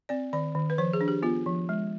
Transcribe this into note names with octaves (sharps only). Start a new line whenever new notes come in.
C4 D5
D#3 D5
D#3
B4
F3 C5
G#4
D4
G4
B3 F4
F3
G#3